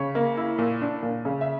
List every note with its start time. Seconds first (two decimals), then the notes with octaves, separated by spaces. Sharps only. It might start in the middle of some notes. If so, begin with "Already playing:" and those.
Already playing: C#3 C#5
0.15 A#3
0.37 E4
0.58 A#2
0.81 D4
1.03 A#2
1.25 C#3
1.41 E5